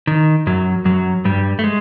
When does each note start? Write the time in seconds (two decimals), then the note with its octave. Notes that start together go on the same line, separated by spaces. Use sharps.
0.07 D#3
0.47 F#2 F#3
0.85 F#2 F#3
1.25 G2 G3
1.59 A3
1.64 G#3